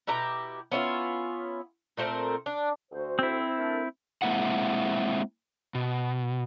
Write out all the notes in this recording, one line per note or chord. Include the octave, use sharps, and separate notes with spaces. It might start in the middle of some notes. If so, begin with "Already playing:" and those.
B2 E4 G4 A#5
B3 C#4 E4 F4
A#2 A3 C4 A#4
D4
D2 F#4 C5
C4 E4
A3 D4 A#4
G#3 A#3 C4 E4 F#5
B2